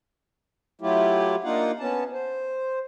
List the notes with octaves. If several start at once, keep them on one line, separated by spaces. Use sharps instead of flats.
F#3 A3 E4 F4 G4
A#3 D4 D#4 F4 F5 F#5
B3 C#4 A5
C5